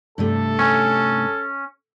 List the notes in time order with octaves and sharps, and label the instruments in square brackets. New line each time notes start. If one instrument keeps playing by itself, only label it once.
[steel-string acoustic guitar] G2 C3 A3 [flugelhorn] A4
[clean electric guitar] C#4